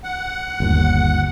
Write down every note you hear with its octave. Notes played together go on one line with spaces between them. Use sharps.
F#5
G1 D#2